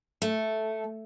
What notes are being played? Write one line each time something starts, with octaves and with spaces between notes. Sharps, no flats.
A3